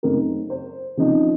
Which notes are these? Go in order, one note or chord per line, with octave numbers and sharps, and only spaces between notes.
F#2 C#3 A3 C4 D#4 A#4
C5
C#3 F3 C4 D#4